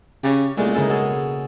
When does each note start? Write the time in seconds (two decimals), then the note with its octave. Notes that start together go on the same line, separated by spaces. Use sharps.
0.24 C#3 G4 C#5
0.58 C2 A#2 G#3 A3
0.75 C#3 A#3 D#4 E4 A4 G#5
0.90 B2 G#4 A4